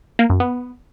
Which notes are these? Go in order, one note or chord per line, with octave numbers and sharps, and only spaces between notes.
A#3
F#2
B3